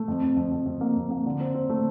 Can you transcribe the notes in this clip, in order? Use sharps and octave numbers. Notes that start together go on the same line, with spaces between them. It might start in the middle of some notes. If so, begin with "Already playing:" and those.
Already playing: A3
F2
F2
F2
F2
F2
A#3
F2
A#3
D3
C4
C4
A3